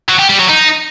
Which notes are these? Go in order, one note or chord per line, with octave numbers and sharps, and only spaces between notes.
F#3
G4
G3
F#3
D#4